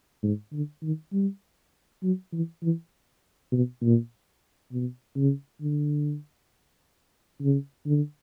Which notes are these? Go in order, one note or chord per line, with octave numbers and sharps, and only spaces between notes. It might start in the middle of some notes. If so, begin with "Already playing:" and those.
G#2
D3
D#3
G3
F#3
E3
E3
B2
A#2
B2
C#3
D3
C#3
D3